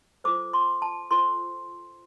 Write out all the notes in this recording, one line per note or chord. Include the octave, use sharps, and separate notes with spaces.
F4 A4 C5 D6
C6
A5
F4 A4 C5 C6